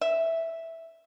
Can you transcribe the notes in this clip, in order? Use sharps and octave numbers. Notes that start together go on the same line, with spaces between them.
E5